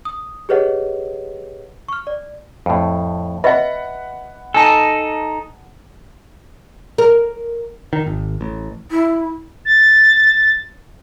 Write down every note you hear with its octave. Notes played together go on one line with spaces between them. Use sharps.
D#6
G4 G#4 B4 C#5 D#5 F#5
C#6 F6
D5
F2 A2
B4 D#5 E5 F#5 B5
D#4 A4 G#5 A5
A#4
D#3
G#1
A1
E4
A6